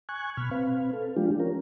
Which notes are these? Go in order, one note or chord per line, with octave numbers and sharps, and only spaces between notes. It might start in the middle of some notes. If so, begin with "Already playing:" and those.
G#5 C#6 F#6 G#6
B2 B5 F6
C4 B4 F5
A4
F3 G#3 D4 F4 G4
C#4 A#4